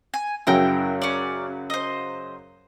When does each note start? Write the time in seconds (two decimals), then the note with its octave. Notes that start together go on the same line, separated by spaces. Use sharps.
0.14 G#5
0.47 F#2 C#3 F#3 E4 A#4 G5
1.02 C#4 D5
1.70 C5 D#5